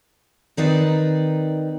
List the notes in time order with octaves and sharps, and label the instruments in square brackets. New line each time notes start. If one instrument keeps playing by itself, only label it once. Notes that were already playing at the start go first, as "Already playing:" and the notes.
[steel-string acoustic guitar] D#3 C4 D#4 B4 D5